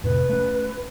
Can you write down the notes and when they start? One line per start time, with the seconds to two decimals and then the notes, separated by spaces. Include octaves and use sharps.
0.04 F2 A2 C3 B4
0.29 A3 C#4